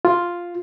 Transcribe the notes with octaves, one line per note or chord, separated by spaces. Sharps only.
F4